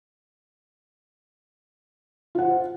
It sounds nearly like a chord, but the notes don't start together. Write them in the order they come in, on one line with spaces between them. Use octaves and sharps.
F4 F#5 C5